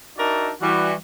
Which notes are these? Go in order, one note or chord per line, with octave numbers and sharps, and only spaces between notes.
D4 D#4 F#4 A#4 D5 E5
E3 G3 F#4